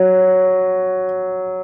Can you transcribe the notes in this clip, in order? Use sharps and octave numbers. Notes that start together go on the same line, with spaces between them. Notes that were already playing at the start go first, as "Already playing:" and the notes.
Already playing: F#3